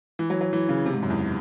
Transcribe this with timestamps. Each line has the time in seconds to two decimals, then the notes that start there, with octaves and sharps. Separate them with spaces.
0.19 E3
0.30 F#3
0.41 F#3
0.53 E3
0.69 C#3
0.86 C3
0.93 G#2
1.03 F#2
1.10 E2